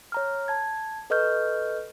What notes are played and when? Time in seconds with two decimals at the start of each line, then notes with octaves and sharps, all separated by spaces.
0.12 C#5 A#5 F6
0.48 A5 G#6
1.10 A4 B4 D#5 C#6 F6 G6